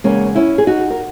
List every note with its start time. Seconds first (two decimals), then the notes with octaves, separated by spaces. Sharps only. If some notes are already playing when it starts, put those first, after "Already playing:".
0.04 E2 C#3 G#3 A#3 C#4
0.35 C#4 E4
0.58 G#4
0.67 D#4 F#4
0.90 A#4